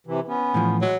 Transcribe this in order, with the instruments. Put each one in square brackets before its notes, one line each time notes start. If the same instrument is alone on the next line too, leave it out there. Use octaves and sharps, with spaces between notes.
[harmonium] C3 E3
B3 C#4
[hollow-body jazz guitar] A2 E3 F3
[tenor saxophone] F#3 [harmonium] G#3